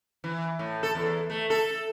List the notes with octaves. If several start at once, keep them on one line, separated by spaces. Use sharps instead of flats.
E3
A2
A4
E2
A3
A4